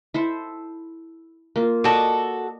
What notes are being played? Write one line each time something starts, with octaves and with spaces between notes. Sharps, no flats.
E4 A4 C5
A#3 F4
F#4 A4 D5 D#5